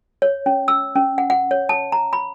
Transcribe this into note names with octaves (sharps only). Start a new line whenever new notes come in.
C#5
C#4
E6
C#4
F#5
F#5
C#5
A5
A#5
B5